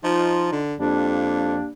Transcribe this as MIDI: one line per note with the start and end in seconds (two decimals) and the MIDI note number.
0.04 0.50 53
0.04 0.58 63
0.04 0.58 65
0.52 0.75 50
0.80 1.58 41
0.80 1.69 55
0.80 1.69 58
0.80 1.69 62